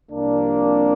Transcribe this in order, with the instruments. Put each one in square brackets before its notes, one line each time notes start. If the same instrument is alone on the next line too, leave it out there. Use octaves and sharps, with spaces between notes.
[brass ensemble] C2 C3 F3 A#3 D4